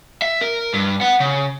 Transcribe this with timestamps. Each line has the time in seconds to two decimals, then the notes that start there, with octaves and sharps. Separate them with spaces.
0.22 E5
0.41 A#4
0.74 G2
1.01 B3 F#5
1.20 C#3